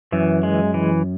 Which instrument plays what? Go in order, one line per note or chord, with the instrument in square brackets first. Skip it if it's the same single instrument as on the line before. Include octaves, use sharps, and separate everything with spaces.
[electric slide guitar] F#2 [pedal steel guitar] E3
[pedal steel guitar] G#3
E3